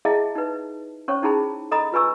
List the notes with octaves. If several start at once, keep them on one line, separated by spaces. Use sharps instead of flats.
E4 G#4 D#5 E5 F#5 A5
D#4 B4
C#4 C5 C#5 C#6
C#4 D#4 E4 G#4 A5 B5
A4 D#5 A#5 B5 D#6
F4 B4 G#5 C#6 E6